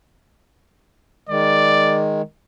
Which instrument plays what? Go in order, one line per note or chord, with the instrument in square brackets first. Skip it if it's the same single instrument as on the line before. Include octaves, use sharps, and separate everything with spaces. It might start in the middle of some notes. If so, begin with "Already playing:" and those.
[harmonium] D#3 G#3 [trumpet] D5